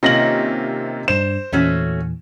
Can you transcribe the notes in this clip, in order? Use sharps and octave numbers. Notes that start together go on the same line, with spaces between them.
C3 D#3 A#3 C#4 D#4 F4 A#6 F#7
G2 D4 C5 E7
E2 A#2 E3 A3 C#4 F#4